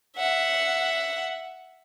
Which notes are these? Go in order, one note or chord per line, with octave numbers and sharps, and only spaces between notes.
E5 F#5